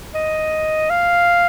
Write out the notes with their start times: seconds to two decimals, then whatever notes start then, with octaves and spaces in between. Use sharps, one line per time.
0.15 D#5
0.90 F5